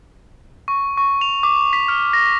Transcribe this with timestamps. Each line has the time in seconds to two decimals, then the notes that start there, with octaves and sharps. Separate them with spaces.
0.68 C#6
0.97 C#6
1.21 F7
1.43 D6
1.73 B6
1.88 F6
2.13 A#6